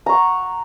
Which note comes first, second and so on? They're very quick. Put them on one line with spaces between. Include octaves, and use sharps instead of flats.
A#5 C#6 F#5